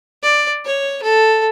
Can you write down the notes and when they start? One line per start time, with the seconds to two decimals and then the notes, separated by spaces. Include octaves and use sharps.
0.22 D5
0.65 C#5
1.03 A4